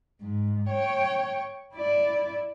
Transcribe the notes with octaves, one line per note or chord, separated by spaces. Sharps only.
G#2
C#5 G5
E4 D5